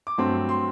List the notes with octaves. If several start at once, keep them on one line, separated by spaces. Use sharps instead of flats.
D6
G2 F#3 A3 C4 C6
C6